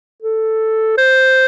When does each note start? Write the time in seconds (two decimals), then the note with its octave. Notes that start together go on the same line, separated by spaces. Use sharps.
0.22 A4
0.98 C5